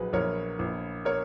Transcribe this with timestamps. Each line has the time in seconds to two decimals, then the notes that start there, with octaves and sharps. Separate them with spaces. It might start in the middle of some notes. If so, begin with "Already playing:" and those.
Already playing: A#1 F#3 G#4 B4
0.13 A#1 A#4 C#5
0.59 A#1
1.05 A#4 C#5